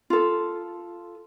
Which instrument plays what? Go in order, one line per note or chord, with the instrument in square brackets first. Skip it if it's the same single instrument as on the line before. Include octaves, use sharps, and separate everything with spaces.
[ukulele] F4 A4